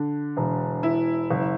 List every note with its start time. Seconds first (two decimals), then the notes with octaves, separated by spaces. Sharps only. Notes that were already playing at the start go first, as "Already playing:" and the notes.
Already playing: D3
0.37 E1
0.83 E3 E4
1.31 F#1